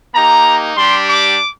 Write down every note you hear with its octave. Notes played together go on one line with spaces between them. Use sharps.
A#3 D#4 G4 A#5
G3 D4 G4 C6
D6